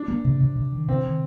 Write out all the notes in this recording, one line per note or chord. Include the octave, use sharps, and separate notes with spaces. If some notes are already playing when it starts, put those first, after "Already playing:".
Already playing: D4
A#3
C3
C3
C3
D#3
C3 C4
D#3